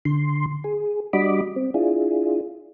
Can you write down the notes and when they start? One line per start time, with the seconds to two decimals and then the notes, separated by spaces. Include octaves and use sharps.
0.05 D3 C6
0.64 G#4
1.13 G3 D4 F#4 D#5 B5 D6
1.56 C4
1.74 D4 E4 F4 G#4